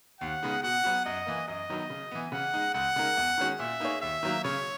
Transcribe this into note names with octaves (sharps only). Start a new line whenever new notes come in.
D#2 F#5
C#3 G#3 B3 D#4
B2 F#5
F#3 B3 F#4
F#2 D#5
E3 A#3
F#2 D#5
D#3 F#3 B3 D#4
C#3
E3 B3
C#3 F#5
G#3 D#4
C#2 F#5
C#3 G#3 D#4 A#4
E2
D#3 G#3 C#4 F#4
A#2 E5
A#3 D#4 G#4 C#5
D#2 E5
D#3 F#3 A#3
C#3 C#5